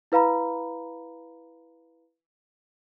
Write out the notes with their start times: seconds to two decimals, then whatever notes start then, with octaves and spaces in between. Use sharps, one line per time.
0.12 E4 B4 F5 A#5 B5